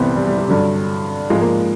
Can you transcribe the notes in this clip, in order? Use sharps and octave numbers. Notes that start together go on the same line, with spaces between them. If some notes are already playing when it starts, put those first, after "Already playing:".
Already playing: C2 C3 E3 B3 C4
G3
G3
G3
G2 D3 F#3
F3 G#3
G#2
A#3